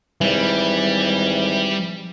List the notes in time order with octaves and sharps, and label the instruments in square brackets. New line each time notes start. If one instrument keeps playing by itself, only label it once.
[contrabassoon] G#1 [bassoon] E3 [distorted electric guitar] G3